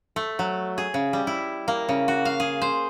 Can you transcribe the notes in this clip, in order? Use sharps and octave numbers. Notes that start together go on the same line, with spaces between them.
A3
F#3
G#4
C#3
G3
E4
A#3
C#3
F#4
F5
G#4
C5